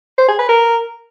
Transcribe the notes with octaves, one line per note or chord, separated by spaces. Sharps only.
C5
G#4
B4
A#4